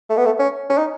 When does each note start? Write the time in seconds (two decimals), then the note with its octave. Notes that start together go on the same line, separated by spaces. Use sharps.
0.10 A3
0.17 B3
0.26 A3
0.39 C#4
0.70 C#4
0.78 D#4